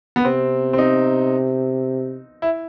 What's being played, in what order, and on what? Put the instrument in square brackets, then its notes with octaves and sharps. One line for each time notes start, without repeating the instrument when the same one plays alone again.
[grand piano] B3
[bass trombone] C3 [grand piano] C4
[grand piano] C4
D#4
E4